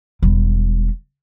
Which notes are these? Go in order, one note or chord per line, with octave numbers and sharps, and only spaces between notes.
E1 G3